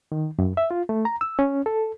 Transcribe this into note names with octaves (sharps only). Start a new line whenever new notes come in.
D#3
F#2
E5
F4
A3
A#5
E6
C#4
A4